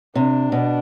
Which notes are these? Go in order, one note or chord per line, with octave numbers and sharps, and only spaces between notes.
C3 D4
B2